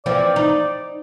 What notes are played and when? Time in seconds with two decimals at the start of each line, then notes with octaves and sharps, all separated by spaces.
0.06 E3 F3 C4 D5
0.36 D#4